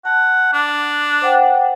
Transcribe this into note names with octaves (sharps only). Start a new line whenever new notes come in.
F#5 A5
D4
C5 F#5 G5